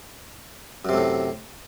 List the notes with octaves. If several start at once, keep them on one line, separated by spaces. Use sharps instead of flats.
F#2 A2 C3 A3